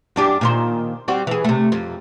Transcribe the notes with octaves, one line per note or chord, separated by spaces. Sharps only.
F#2 D4 G4
A#2 D#3 C5
G3 C4 F#4
E3 G#4
C3 A3
F2